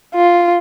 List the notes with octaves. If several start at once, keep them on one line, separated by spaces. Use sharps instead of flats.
F4